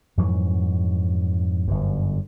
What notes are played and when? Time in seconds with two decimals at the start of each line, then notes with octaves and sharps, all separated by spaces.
0.17 F2 G#2 E3 F#3
1.68 G1 F#2